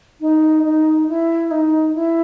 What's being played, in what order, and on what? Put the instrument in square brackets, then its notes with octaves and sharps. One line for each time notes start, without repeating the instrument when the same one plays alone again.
[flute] D#4
D#4
E4
D#4
E4